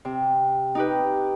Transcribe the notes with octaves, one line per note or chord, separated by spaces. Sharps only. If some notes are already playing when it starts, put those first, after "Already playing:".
C3
D#4 G4 B4